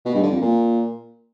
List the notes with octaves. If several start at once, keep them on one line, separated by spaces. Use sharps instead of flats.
B2
G2
D3
F2
A#2